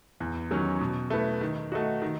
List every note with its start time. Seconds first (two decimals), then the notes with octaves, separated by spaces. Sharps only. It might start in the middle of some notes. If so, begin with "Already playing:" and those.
0.20 E2
0.51 D#3 F#3 C#4
0.81 B2
1.10 A3 E4 B4
1.41 D#3
1.72 A3 D#4 F#4
2.02 D#3